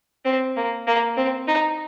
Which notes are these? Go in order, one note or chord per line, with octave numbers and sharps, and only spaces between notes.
C4
A#3
A#3
C4
D#4